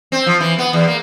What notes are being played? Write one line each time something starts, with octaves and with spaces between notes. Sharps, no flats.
C4
F3
E3
B3
E2
A#3